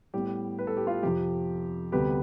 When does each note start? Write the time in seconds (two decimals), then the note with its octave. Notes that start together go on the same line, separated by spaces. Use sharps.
0.14 A2 G3 B3 G4
0.59 B4
0.67 A4
0.77 G4
0.87 F4 A4
1.03 F2 C3 F3 G4
1.92 D2 C3 G3 B3 G4 B4